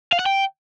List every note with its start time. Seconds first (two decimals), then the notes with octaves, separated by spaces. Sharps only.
0.13 F5
0.19 F#5
0.26 G5